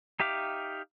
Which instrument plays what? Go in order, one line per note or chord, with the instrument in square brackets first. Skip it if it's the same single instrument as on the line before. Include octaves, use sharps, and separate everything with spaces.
[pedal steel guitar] D#4 G4 E5 F5 D6